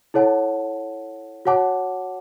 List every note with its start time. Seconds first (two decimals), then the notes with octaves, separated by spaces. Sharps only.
0.14 E4 A4 C#5 F#5 A5
1.45 F#4 C#5 F#5 A5 D6